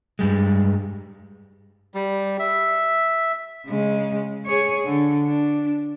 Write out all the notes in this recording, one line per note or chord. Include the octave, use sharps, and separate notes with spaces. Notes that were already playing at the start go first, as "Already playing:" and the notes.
G2 G3 G#3
G3
E5
C#3 G#3
G#4 C#5
D3
D4